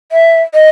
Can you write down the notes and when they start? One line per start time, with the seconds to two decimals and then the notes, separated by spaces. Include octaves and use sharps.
0.12 E5
0.54 D#5